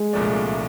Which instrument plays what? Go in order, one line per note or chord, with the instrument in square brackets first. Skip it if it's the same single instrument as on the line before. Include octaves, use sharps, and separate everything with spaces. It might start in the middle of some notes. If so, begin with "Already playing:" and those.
Already playing: [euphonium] G#3
[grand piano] C2 A#2 F3 A3 D4